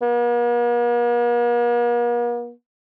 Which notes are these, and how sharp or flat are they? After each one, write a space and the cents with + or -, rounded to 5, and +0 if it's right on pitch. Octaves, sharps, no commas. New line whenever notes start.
A#3 +45